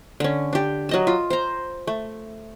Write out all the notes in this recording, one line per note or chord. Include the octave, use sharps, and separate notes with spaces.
D3 C#4
D4 G4
F#3 D#5 A5
F4
C5 A#5
A3